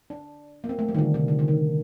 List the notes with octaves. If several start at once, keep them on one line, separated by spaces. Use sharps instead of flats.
D4
A#3
C4
A3
G3
D#3
D3
C3
D3
D3
D#3